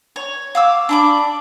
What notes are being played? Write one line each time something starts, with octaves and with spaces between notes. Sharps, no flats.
C#5
F5 D6 E6
D4 B5 D6